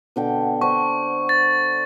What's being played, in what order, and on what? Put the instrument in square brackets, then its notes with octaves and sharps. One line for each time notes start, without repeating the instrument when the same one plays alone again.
[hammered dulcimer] B2 D3 G5
[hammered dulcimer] D4 C5 [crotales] C#6
[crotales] A6